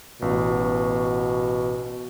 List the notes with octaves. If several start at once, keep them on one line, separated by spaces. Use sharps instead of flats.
A1 B2